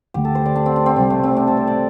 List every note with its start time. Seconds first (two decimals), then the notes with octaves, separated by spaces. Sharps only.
0.14 D2 D3 A3 G4
0.25 A4
0.35 C5
0.45 D5
0.55 D4
0.66 C4
0.76 D4
0.86 C4
0.96 C2 C3 G3 C4
1.10 A3
1.23 C4
1.37 D4
1.47 A4
1.57 C5
1.67 D5